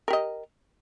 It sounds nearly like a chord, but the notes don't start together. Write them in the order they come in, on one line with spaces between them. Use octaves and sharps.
A#4 G4 D#5